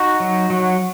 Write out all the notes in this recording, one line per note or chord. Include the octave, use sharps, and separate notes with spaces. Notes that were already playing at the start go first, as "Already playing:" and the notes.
Already playing: D#4 F#4
F#3
F#3